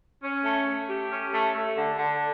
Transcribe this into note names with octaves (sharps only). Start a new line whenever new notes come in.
C#4
A3
A3
G4
C#4
A3
A3
D3
D3